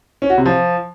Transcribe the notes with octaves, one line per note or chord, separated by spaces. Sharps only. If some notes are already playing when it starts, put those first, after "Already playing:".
C#4
F#4
C3
F3